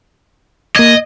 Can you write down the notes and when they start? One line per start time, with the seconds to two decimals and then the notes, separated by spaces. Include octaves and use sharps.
0.76 A#3 D#5 G#6